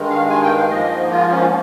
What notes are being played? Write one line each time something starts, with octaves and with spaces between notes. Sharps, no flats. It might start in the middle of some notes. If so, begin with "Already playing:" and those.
Already playing: G2 D#3 G#3
F5
G#5
G5
F5
G#2 F3 A#3 D#5
F4
C#4